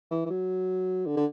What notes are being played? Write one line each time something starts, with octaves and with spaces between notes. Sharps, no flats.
E3
E3
F#3
D3
D3